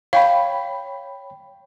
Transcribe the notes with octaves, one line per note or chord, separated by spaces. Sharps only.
C#5 F5 G5 B5